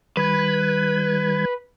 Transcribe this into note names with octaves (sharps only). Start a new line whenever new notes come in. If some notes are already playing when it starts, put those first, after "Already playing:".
D#3 G3 B4 G#6